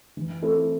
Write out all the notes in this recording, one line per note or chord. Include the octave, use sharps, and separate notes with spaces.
E3
A3 C4 E4 A4